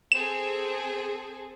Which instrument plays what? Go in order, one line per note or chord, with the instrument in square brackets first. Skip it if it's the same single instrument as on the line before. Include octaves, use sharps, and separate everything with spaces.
[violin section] C4 G#4 A4 [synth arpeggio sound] E7